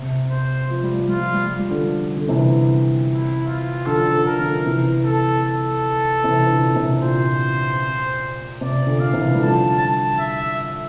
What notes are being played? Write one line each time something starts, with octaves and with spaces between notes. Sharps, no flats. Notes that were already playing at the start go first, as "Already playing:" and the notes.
Already playing: C3
C5
F3
G3
F3
G3 F4
F3
G3
F3
G3
D3 F3
D3
C3 E3
E4
F4
D3 F3 A4
D3 F3
A#4
D3 F3
C3 E3
A4
A4
C3 E3
A#2 D3
C3
A#2 C5
C3 D5
A#2 D3
F5
C3 E3
G3
D3 F3 A5
A5
E5